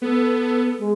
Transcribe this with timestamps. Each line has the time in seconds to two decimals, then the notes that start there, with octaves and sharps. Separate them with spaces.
0.02 B3 A4
0.79 G#3